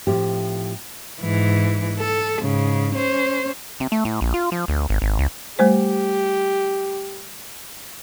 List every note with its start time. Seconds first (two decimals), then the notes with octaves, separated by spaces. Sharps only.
0.07 A2 F3 C4 G4
1.21 G#2 E3
1.99 A4
2.41 G#2 C#3
2.95 C#4 C5
3.80 C3
3.92 A3
4.05 A2
4.21 A#1
4.34 F4
4.52 F3
4.68 D2
4.89 G#1
5.02 G#1
5.19 C#2
5.59 G3 A3 G4 C5